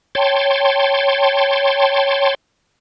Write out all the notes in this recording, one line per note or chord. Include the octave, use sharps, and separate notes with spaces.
C#5 G5 A5 C6